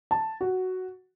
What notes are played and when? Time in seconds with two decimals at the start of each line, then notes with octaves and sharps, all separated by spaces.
0.11 A5
0.41 F#4